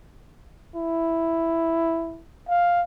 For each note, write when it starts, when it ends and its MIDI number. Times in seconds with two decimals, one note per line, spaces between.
0.75 2.22 64
2.49 2.83 77